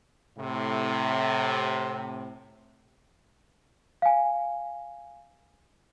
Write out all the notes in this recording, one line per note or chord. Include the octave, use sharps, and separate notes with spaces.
A2 C3
F5 G#5